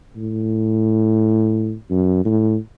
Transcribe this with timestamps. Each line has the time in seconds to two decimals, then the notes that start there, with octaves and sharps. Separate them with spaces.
0.16 A2
1.91 F#2
2.25 A2